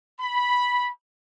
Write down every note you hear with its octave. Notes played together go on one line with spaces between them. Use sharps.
B5